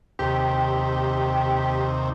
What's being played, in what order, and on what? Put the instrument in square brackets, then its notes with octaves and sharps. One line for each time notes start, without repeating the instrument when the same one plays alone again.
[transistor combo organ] D#2 C3 [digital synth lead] G4